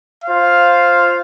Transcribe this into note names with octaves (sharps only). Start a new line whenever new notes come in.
F4 C5 F5